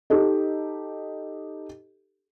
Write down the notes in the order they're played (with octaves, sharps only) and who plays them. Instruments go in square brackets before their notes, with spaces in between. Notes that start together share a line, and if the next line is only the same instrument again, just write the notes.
[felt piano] D#4 G4 A4 D#5